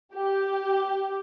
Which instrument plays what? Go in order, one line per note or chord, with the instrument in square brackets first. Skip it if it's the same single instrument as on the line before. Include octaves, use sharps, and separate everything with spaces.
[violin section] G4